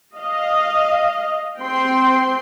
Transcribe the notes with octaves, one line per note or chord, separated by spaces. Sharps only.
D#5 F5
C4 G5 C6